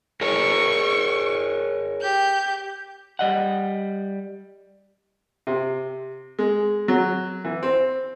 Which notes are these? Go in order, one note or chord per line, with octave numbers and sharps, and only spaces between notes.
G#4 A#4 C#5 C#6
G4 G6
G3 D#5 F#5
C3
G#3
F#3
E3
C4